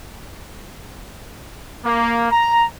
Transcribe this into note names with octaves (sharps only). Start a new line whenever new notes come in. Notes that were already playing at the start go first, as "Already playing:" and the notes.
A#3
A#5